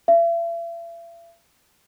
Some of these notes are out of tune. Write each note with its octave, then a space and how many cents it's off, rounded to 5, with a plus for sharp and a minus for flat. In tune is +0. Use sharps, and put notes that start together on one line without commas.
E5 +45